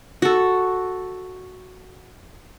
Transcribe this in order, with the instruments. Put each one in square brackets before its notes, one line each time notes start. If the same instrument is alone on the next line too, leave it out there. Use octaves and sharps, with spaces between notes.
[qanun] F#4 A4